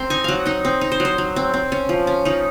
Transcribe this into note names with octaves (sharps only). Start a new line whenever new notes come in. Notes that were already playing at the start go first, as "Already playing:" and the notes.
Already playing: C4 A#5 C6
D#4 G#5
F#3 F5 F#5
D#4 D#5
C4
D#4
C5
F#3
C5
F#3
C4
C4
C#4
F3
C#4
F3 D#4